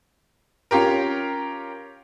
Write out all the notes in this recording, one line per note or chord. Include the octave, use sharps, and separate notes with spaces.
C#4 F4 G4 A#4